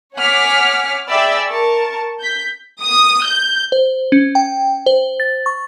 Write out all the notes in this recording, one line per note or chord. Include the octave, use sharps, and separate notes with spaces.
C#5 F#5 G#5 D6 F6 B6
G#4 D5 E5 G5 B5 E6
A#4 A5 C#6
G6 B6
D#6
G6
C5
C#4
G5
C5
A6
C#6